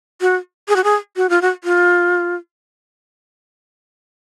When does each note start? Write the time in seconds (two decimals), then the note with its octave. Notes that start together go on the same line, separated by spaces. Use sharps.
0.21 F#4
0.69 G#4
0.76 F#4
0.84 G#4
1.16 F#4
1.30 F4
1.42 F#4
1.64 F4